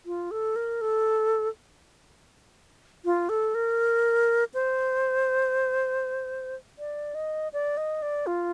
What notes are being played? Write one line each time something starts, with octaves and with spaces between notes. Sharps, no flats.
F4
A4
A#4
A4
F4
A4
A#4
C5
D5
D#5
D5
D#5
D5
F4